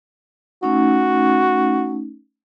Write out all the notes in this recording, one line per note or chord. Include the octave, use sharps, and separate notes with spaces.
A3 C#4 D#4 F#4